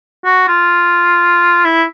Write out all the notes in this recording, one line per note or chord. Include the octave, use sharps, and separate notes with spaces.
F#4
F4
E4